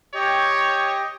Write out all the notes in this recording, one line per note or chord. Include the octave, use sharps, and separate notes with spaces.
G4 C#5 D#5 G5